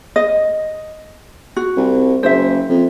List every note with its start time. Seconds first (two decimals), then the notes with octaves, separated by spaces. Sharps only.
0.16 D#5
1.56 F#4
1.77 C2
2.23 F#1 C5 E5
2.69 F2